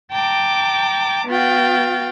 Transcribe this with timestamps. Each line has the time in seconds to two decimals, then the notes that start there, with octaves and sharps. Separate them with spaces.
0.11 G5 A5 A#5 D6
1.27 B3 F#4 F5 G5 A6